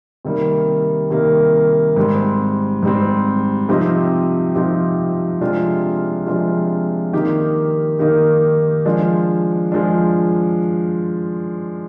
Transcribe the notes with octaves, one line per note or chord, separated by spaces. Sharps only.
C3 D#3 G3 A#3
C3 D#3 G3 A#3
G#2 G3 C4
G#2 G3 C4
C3 F3 C4 D#4 G4
C3 F3 C4 D#4 G4
C3 F3 G#3 D4 F4
C3 F3 G#3 D4 F4
D#3 A#3 D#4 G4
D#3 A#3 D#4 G4
F3 G#3 D4
F3 G#3 D4